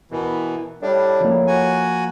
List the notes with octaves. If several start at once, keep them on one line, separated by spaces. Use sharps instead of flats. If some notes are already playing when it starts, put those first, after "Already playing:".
B2 E3 A#4
A2 G3 D4
F3 A#3
F#4 G#5